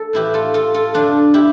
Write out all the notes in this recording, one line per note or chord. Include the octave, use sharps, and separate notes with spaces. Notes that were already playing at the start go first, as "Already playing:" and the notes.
Already playing: A4
A2 E3 E4 G4
F4 A4
F4 A4
F4 A4
F2 D3 F3 D4 F4
E4 G4